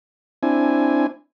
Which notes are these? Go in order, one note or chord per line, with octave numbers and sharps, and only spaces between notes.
C4 D4 E4 G#5